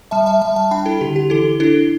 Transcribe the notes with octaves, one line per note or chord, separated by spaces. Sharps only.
G3 E5 A5
E5 A5
G3 E5 A5
E5 A5
D4 G5 B5
E4 A4
D3 G4
G4
E3 E4 A4
D4 E4 A4